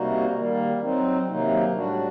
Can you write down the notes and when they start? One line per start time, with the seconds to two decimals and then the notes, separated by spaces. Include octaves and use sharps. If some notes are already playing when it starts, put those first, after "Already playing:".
Already playing: C3 G3 A#3 D#4 F#4
0.35 D#3 G3 A#3
0.81 F#3 C4 D#4
1.28 C3 D#3 F#3 A#3 D#4
1.74 A2 G3 D4 F#4